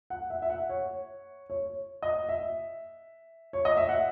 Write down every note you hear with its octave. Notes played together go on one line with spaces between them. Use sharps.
F#5
E5
E5
F#5
C#5
C#5
D#5
E5
C#5
D#5
E5
F#5